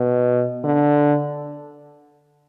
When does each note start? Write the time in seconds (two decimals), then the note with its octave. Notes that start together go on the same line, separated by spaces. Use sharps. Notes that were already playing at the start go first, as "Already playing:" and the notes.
Already playing: B2
0.64 D3